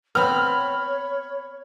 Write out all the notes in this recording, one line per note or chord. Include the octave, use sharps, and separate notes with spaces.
B3 C4 C#5 B5 F6